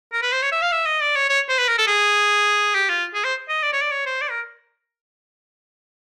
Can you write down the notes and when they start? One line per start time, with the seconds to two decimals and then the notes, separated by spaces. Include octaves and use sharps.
0.12 A#4
0.22 B4
0.32 C5
0.42 C#5
0.52 E5
0.62 F5
0.72 E5
0.86 D#5
1.01 D5
1.15 C#5
1.29 C#5
1.49 C5
1.58 B4
1.68 A#4
1.78 A4
1.87 G#4
2.75 G4
2.89 F4
3.14 G#4
3.24 C5
3.48 D#5
3.63 D5
3.72 C#5
3.81 D5
3.91 C#5
4.06 C5
4.21 D5
4.30 A#4